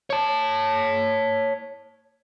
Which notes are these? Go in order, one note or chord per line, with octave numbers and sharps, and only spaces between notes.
C#5 A5